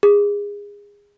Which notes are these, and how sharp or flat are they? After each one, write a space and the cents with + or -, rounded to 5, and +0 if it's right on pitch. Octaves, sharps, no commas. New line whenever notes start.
G#4 -25